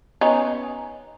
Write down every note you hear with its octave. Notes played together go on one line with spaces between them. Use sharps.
B3 C#4 D#4